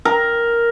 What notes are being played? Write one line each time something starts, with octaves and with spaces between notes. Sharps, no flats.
A#4